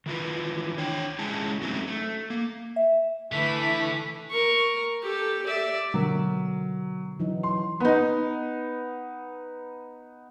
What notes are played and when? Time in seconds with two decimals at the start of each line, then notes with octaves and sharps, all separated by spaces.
0.06 D#3 E3 F4 B4
0.78 D4 C#5 G5
1.19 G#3 C#4 E4 G#4 C#5 A5
1.62 F#3 A3 C4 C#4 D#4
1.88 A3
2.30 A#3
2.76 E5
3.32 D3 E3 A3 B6
4.30 A#4 C#6
5.03 G4 A4
5.46 D5 E5
5.94 B2 D3 F#3 A#4
7.20 E3 F#3 D#4
7.43 C6
7.80 B3 D#4